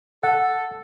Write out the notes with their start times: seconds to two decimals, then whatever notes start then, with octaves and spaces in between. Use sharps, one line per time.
0.23 A4 F#5